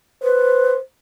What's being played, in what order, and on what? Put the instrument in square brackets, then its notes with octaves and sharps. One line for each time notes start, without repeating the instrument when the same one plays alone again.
[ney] B4 [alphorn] C5